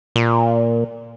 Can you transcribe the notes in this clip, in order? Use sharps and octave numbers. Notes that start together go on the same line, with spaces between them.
A#2